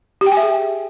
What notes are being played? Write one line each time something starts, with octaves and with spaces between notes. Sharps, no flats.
G4
G5
G#5
E5
G#4